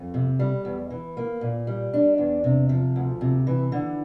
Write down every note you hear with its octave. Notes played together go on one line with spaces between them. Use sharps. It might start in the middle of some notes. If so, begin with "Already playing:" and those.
Already playing: F2
C3
G3
E2
E3
A#3
A#2
G3
D4
E2
C3
F3
D2
C3
E3
D3